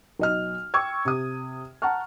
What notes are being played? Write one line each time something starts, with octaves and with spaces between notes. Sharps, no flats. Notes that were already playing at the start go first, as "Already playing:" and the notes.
B1 D#5 F6
G5 C#6 D6 E6 G#6
C3 D#6
F#5 A5 A#5 C#6 F6